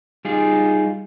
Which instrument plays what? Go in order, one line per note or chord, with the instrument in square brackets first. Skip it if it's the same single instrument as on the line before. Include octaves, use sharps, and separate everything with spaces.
[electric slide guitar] G3 D#4 F4 G#4